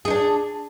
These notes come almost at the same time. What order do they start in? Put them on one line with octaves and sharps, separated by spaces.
G#4 D#4 D4